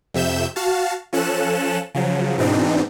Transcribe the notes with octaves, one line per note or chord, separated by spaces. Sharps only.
F2 C3 E5 G6 E7
F#4 F5 A5
F3 C#4 A4 F#6 E7
C#3 F3 F#3
G#2 B2 E3 C4 D4 D#4